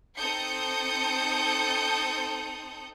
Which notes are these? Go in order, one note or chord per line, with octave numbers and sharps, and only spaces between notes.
C4 D#4 A4 D#6 G6 C#7